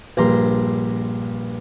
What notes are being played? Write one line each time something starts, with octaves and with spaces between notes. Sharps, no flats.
A#1 G2 A#5 C6